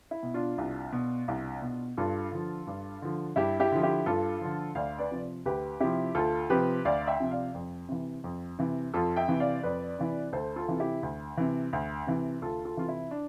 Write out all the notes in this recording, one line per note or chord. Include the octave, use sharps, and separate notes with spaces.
E4
B2
D4 F4
C2
B2
C2
B2
G2 F4 A4
D3 F3
G2
D3 F3
G2 E4 G4
E4 G4
D3 F3
E4 G4
G2 F4 A4
D3 F3
D2 D5 F5
B4 D5
C3 F3
D2 G4 B4
C3 F3 E4 G4
D2 F4 A4
C3 F3 G4 B4
D2 D5 F5
E5 G5
C3 F3
D5 F5
F2
C3 E3
F2
C3 E3
F2 F4 A4
E5 G5
C3 E3
D5 F5
F2 B4 D5
C3 E3
D2 A4 C5
F4 A4
C3 E3
E4 G4
D2
C3 E3
D2
C3 E3
D2 F4 A4
F4 A4
C3 E3 F4
E4
D4